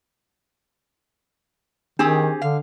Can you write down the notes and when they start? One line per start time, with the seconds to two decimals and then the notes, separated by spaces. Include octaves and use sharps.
1.99 D#3 C4 D4 G4 G#4
2.42 D3 F5